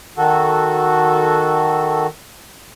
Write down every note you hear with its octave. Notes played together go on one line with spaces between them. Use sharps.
D#3 F#4 A4